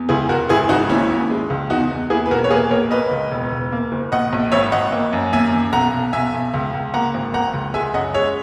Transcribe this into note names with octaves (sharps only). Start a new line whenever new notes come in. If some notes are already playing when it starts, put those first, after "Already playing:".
Already playing: E2
C#2 E4 G#4
C#2 F#4 A#4
G#1 E4 G#4
G#1 D#4 F#4
D#2 C#4 E4
D#2
G#3
C#2
E2 D#4 F#4
E2
A#3 E4 G#4
B4
E1 F#4 A#4
C#5
A#3 G#4 B4
A#1 A#4 C#5
A#3 B4 D#5
C#2
E1
E1
A#3
F#1
A#1 D#5 F#5
A#1
G#1 C#5 E5
G#1 D#5 F#5
A#3
F#2
D#2 E5 G#5
D#2
B1 F#5 A#5
B1
B1 E5 G#5
B1
C#2
C#2
A#3 F#5 A#5
G#1
A#3 F#5 A#5
C#2
G#3 E5 G#5
F#2 D#5 F#5
G#3 C#5 E5